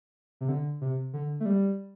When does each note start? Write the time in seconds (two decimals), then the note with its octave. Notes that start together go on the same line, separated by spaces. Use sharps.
0.41 C3
0.49 D3
0.81 C3
1.13 D3
1.40 A3
1.46 G3